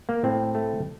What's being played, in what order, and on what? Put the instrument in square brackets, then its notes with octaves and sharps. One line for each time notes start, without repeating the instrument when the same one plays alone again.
[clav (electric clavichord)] A#3
A2 C4
A3